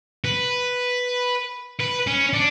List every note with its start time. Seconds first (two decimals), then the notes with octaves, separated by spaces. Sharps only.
0.24 B4
1.80 B4
2.07 C#4
2.33 D4